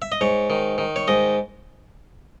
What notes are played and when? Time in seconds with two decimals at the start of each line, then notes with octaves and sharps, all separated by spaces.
0.02 E5
0.12 D#5
0.21 G#2 C#5
0.50 D#3
0.78 D#3
0.96 C#5
1.08 G#2 D#5